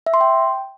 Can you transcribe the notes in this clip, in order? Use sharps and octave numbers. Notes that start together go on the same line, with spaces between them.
E5
C6
G5